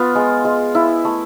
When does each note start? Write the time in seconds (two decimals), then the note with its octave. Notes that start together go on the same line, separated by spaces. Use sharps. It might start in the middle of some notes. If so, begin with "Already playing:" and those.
Already playing: B3 F4
0.15 G#3
0.45 G#3
0.75 E4
1.05 A3